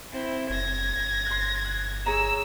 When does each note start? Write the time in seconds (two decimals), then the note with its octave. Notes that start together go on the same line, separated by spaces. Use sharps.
0.12 C4 E4
0.49 F#1 G#6 A#6
0.96 G1
1.26 C6 F#6
1.65 F#6
2.06 G#4 C#5 A#5 E6